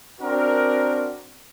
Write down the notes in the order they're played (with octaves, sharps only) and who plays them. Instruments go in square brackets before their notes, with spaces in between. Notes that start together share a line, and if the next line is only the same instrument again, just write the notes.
[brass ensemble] C4 D4 F#4 A#4